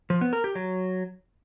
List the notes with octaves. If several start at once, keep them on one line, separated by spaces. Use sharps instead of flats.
F3
B3
A#4
G4
F#3